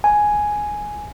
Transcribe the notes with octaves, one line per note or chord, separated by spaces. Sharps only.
G#5